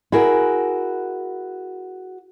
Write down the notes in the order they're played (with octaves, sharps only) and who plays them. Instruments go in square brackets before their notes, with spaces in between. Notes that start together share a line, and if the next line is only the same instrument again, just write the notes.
[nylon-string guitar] E4 F#4 G#4 A#4